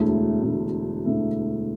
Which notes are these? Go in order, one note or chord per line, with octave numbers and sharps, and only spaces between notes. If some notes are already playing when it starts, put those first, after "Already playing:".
Already playing: E1 D2 D3 A3 E4
E1 D2 D3 A3 E4
E1 D2 D3 A3 E4